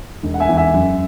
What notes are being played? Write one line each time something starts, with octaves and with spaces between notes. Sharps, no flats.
E1
F#5
E5 G#5
E2
E5 G#5
F#2